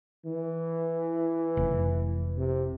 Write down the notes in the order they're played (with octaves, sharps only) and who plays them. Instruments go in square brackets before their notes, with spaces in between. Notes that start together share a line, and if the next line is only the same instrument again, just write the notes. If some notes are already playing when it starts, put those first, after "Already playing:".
[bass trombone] E3
[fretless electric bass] F1
[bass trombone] C3